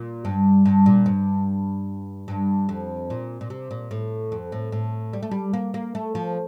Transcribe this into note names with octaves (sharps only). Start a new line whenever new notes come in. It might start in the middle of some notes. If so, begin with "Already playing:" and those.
Already playing: A#2
G2
G2
A#2
G2
G2
F2
A#2
A#2
C3
A#2
A2
F2
A2
A2
G3
A3
G3
A#3
A#3
A3
F3